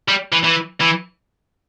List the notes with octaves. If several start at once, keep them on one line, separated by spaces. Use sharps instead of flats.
G3
E3
E3
E3